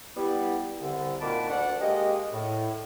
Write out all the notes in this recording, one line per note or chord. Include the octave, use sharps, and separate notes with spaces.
G3 B3 E4
C2 D3
A#2 D#3 F#4 A5 B5 D6
D2 D4 F#5
G#3 A#3 G4 D#5
A2